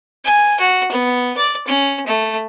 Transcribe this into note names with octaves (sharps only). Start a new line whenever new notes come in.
G#5
F#4
B3
D5
C#4
A3